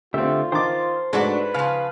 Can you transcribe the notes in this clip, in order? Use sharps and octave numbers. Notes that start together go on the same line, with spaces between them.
D3 A3 C4 F4 G4 E5
D#3 C5 A5 D6
G#2 A3 D4 F#4 B4
C#3 F3 F5